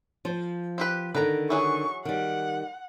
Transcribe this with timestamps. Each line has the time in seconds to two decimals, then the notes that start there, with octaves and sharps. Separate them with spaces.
0.25 F3 C5
0.78 C4 G4 B4
1.15 D3 D#3 B4 A#5
1.50 E3 F#3 G#4 C#6
2.05 D#3 G3 F#5